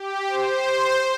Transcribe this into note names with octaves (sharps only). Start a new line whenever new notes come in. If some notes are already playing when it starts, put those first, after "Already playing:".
Already playing: G4
C5